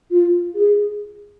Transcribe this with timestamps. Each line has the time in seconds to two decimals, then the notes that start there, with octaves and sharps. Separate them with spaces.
0.11 F4
0.55 G#4